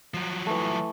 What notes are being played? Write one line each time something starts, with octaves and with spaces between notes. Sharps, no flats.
F3 F#3
E3 A3